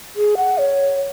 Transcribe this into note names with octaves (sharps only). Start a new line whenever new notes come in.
G#4
F#5
C#5